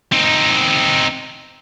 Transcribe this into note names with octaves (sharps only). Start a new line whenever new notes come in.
C4 D#4